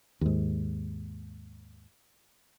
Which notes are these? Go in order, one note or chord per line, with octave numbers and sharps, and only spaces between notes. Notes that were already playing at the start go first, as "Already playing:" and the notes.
D#2 G#2